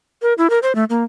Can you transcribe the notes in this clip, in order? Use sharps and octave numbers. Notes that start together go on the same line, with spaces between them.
A#4
E4
A#4
C5
A3
A#3